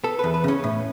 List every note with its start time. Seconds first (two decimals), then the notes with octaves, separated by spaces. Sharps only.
0.04 B3 A4
0.19 E2 B4
0.34 B4
0.44 C#3 C#4
0.64 A2